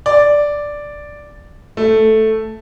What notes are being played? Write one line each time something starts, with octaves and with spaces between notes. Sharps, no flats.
D5
A3